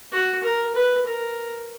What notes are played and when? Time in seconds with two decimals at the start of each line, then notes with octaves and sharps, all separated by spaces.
0.12 F#4
0.43 A#4
0.75 B4
1.06 A#4